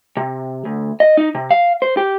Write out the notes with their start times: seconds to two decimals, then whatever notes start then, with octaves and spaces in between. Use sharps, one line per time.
0.17 C3
0.65 D2
1.00 D#5
1.17 D#4
1.35 C3
1.51 F5
1.82 C5
1.97 G4